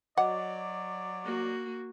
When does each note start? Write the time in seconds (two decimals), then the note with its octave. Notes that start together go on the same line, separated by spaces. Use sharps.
0.17 F#3 D5 D#5 F#5 D6
1.25 A#3 F#4